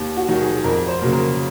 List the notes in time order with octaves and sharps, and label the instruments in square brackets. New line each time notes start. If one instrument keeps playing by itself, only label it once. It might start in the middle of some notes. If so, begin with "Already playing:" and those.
Already playing: [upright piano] D#2
F#4
D#3 F#3
G#4
F2 A#4
C5
C#3 F#3 A#3
A#4